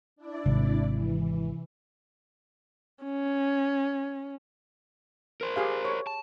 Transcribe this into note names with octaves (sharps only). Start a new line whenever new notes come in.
D4 E4 D5
G#1 C3
E3
C#4
A#4 C5
G4 G#4 F5
C#5
A5